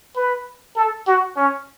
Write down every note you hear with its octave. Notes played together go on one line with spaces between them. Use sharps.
B4
A4
F#4
C#4